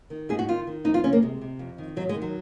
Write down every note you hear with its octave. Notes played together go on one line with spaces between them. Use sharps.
D#3
G#2 G#4
F#4
D#3 F4
D#3
F2 D#4
F4
C#3 C#4
A#3
C3 G#3
C3
F2
D#3
G#2 F#3
G#3
D#3
F#3